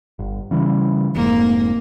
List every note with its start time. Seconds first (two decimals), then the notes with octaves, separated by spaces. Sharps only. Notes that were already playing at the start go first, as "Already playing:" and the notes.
0.19 G1
0.51 C#3 E3 G3
1.15 F1 G#2 A#3